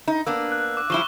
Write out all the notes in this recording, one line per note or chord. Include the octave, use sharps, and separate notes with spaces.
D#4
A#3 B3 D4 E6
F#6
D6 F#6
F3 G3 E4 C#6 E7 G7